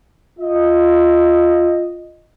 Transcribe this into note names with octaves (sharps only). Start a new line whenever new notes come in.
F4 D#5